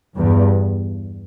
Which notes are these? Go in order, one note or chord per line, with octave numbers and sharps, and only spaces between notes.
E2 G2